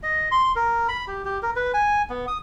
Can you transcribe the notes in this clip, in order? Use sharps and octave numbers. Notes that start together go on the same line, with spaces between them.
D#5
C6
A#4
B5
G4
G4
A#4
B4
G#5
B3
D#6